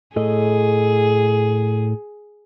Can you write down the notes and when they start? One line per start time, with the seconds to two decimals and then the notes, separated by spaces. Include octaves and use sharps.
0.16 A2 G#4 A4 D#5